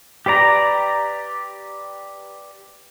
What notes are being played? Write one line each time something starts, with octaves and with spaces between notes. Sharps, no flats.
G4 B4 D5 A#5